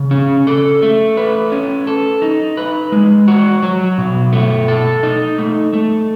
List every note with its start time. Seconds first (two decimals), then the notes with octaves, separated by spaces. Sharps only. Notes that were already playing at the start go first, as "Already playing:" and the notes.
Already playing: C#3
0.11 C#4
0.47 A4
0.82 A3
1.17 B4
1.52 C#4
1.87 A4
2.22 D#4
2.57 B4
2.92 G#3
3.28 F#4
3.62 F#3
3.98 B2
4.33 A3
4.68 A4
5.03 D#4
5.38 A3
5.73 A3